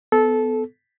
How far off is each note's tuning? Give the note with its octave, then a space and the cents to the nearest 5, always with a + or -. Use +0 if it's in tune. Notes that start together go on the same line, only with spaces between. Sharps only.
B3 +25 A4 -15